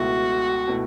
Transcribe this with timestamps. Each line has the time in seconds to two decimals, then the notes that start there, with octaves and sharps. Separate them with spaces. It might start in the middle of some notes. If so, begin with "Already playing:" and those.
Already playing: C#2 B2 A3 E4 F#4
0.68 B2 A3 E4